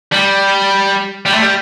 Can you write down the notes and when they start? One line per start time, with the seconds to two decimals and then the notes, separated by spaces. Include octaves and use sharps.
0.13 G3
1.26 G3
1.34 A3
1.42 G3